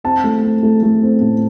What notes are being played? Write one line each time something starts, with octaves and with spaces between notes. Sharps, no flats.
C4 A5
A3
C4
A3
A3
C4
A2